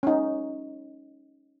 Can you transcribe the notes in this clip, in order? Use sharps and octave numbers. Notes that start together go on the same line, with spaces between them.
C#4 D#4